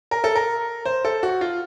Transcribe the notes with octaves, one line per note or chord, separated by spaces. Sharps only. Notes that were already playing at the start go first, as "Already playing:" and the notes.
A#4
A4
A#4
C5
A4
F#4
F4